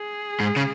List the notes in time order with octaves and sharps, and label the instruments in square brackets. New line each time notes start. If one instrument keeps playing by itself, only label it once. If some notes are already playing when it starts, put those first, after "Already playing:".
Already playing: [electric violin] G#4
[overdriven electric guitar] G#2
C#3